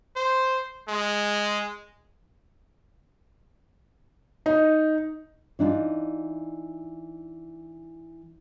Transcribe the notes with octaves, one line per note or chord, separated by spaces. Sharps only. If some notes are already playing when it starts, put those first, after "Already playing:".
C5
G#3
D#4
E3 D4 D#4 F4